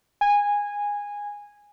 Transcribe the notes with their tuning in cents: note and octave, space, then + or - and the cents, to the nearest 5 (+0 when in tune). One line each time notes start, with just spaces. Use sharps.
G#5 -20